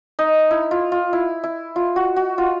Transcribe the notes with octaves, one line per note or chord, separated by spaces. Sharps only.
D#4
E4
F4
F4
E4
E4
F4
F#4
F#4
F4